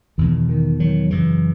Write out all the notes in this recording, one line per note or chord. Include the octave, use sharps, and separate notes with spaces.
E2 B2 D#3
D#3
D#3 F#3
F#2 C#3 E3